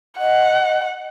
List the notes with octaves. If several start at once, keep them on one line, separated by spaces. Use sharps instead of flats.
D#5 F#5